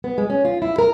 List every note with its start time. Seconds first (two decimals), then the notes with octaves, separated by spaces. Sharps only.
0.04 B3
0.18 G#3
0.30 C#4
0.45 F4
0.62 E4
0.79 A#4